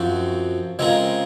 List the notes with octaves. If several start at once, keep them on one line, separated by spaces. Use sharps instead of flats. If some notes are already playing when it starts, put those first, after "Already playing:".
Already playing: F#2 F3 C4 F#4 C5
C#3 G#3 C4 F4 A#4